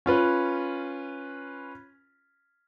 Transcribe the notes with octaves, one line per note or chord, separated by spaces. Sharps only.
C#4 F4 B4